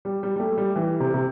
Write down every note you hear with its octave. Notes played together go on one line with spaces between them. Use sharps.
G3
G3
G3
A3
G3
E3
C3
C3